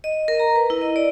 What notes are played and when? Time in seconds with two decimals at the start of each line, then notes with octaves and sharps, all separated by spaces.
0.04 D#5
0.28 A#4
0.40 A#5
0.56 B4
0.70 E4
0.81 D#5
0.96 D5